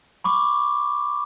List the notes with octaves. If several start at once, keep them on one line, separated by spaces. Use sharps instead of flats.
B5 C#6 D6